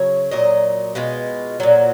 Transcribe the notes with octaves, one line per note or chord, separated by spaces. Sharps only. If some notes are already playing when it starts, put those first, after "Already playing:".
Already playing: C#3 F#3 C#5
A#2 F#3 D#5
B2 G#3 F4
A#2 F#3